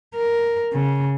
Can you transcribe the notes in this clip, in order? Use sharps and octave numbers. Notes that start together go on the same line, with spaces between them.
A#4
C#3